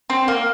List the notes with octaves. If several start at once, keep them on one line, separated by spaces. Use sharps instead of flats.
C4
A#3